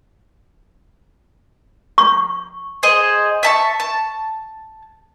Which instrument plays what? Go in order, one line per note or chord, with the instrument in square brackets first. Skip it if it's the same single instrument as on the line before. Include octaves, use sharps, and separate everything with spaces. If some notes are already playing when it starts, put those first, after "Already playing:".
[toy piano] C#6
[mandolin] G#4 C5 D#5
E5 A5 C#6
A5